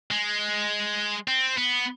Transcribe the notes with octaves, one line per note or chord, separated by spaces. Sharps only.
G#3
C4
B3